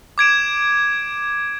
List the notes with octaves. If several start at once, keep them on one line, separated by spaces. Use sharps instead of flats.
D6 G#6 D7 E7